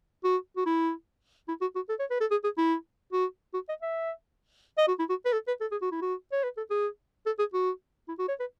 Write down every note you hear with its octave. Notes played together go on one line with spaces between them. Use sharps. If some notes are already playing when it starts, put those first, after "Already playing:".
F#4
F#4
E4
E4
F#4
F#4
A4
C#5
B4
A4
G#4
G#4
E4
F#4
F#4
D#5
E5
D#5
F#4
E4
F#4
B4
A4
B4
A4
G#4
F#4
E4
F#4
C#5
B4
A4
G#4
A4
G#4
F#4
E4
F#4
C#5
B4